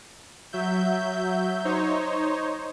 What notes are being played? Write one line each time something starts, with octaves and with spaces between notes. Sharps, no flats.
F#3 E5 G6
D#4 C5 C#5